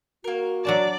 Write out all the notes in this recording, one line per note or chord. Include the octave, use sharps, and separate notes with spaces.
A#3 F#4 A#4
F#3 D4 D5 A5